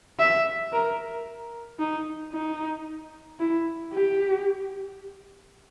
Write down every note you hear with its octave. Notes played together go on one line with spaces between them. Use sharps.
E5
A#4
D#4
D#4
E4
G4